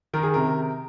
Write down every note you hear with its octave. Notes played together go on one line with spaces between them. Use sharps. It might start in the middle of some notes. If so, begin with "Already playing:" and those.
D#3 A#4
G#4
C3 A#4